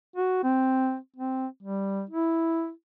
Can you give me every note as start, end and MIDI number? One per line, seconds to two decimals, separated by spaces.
0.16 0.40 66
0.44 0.97 60
1.16 1.47 60
1.63 2.02 55
2.09 2.70 64